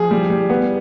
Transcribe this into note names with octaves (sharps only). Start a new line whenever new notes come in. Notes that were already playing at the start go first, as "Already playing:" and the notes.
Already playing: F3 G#4
G3
G3
B3